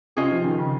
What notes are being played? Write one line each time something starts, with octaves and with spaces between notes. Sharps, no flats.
C3 C#4 F4 G#4 D#5
F3
D#3
C#3